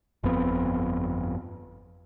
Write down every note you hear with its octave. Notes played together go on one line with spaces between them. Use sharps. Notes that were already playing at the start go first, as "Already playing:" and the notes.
G1 F2 B3 C4